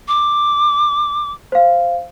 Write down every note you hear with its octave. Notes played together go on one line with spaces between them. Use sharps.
D6
C5 F5